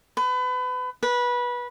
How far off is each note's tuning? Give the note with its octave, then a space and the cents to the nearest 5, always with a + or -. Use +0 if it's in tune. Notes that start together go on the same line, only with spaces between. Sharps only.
B4 +30
B4 -20